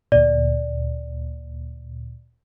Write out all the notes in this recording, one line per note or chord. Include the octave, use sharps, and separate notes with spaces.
D2 A#2 D5